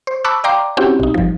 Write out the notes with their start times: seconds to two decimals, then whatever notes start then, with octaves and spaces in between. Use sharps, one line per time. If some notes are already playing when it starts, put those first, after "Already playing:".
0.07 C5
0.24 A5 B5 C#6 D6 E6 F#6
0.44 D5 F5 G5 A#5 C6 D6
0.77 C4 C#4 E4 F#4 G4
1.00 B1 D#4
1.14 G1 F3